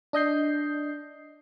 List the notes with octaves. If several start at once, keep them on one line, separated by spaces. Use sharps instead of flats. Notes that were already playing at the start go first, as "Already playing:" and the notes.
D4 D#5 G6 C7